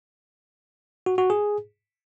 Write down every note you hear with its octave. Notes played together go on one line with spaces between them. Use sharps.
F#4
F#4
G#4